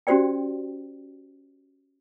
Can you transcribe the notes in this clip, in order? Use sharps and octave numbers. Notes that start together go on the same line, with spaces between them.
C#4 F#4 G4 C5 D5 G5